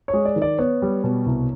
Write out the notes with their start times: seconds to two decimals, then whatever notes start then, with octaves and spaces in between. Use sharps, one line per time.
0.08 C#5
0.13 G#3
0.25 D5
0.36 D#3
0.42 D5
0.59 B3 C#5
0.82 G3
1.04 B2
1.26 C2